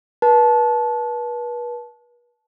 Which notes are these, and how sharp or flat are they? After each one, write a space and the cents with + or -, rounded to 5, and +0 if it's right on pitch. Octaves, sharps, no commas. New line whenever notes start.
B4 -35 A5 -20